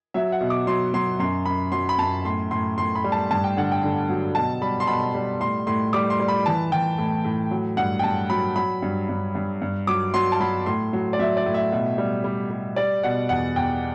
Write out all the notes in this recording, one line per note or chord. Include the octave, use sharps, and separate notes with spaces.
F#3 E5
F#5
B2
D6
F#3 C6
F#3 C6
F#2 C6
F#2 B5
F#3 C6
B5
F#2 A5
A2 C6
A2 C6
A2 C6
B5
G3
A5
G2 A5
G5
D3 F#5
G5
D3
F#3
B2 A5
G3 B5
C6
B2 B5
G3
A2 C6
A2 C6
G3 D6
C6
G3
B5
E3 A5
E3 G5
A2
A2
F#3
G2 F#5
G5
G2 A5
F#3 B5
F#3 B5
G2
G2
G2
G2
F#3 D6
F#3 C6
A5
F#3 B5
A2 C6
F#3
D5
F#3 E5
D5
A2
E5
B2
G3
G3
G3
G3 D5
B2 F#5
E2 F#5
E2 G5